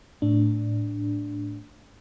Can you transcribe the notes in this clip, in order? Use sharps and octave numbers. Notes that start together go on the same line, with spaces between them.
A2 D4